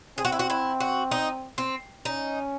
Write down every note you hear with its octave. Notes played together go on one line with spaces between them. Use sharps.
C4 G#4
F#4
E4
F#4
E4
F#4
D#4
C4
C#4 D#4